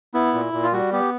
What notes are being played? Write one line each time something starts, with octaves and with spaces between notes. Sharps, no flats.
B3 E4
A#2
A#2
F4
G3 F#4
B3 G4